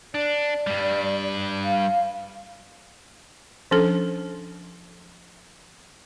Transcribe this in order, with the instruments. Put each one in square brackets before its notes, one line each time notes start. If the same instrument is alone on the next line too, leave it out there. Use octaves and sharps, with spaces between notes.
[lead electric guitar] D4 [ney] D5
[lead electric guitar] G2 G3
[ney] F5
[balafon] F3 C#4 D4 A4